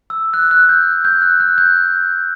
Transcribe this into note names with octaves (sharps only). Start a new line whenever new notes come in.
E6
F#6
F#6
G6
G6
F#6
F#6
G6